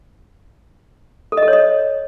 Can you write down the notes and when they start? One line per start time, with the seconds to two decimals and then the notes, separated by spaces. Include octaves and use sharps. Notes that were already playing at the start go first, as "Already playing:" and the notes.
1.32 A4
1.37 D#5
1.43 A4
1.48 C#5
1.53 D#5